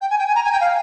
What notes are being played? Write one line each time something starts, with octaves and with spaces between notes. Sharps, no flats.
G5
G#5
G5
G#5
A#5
G#5
G5
F5